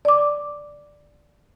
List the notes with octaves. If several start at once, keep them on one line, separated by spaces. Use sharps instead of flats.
D5 D6